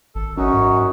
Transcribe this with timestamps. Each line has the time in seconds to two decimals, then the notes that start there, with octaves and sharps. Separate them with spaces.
0.15 G#1 A4
0.37 F#2 C#4 D#4 F#4
0.54 G#2